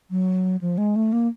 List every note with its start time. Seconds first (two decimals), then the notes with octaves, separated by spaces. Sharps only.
0.11 F#3
0.61 F3
0.78 G#3
0.96 A3
1.13 A#3